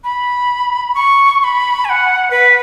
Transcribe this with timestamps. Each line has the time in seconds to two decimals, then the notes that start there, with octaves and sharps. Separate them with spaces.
0.04 B5
0.95 C#6
1.40 C#6
1.44 B5
1.85 G#5
1.90 F#5
2.31 B4